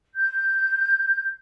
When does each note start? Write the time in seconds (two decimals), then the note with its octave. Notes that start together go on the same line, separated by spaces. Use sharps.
0.15 G6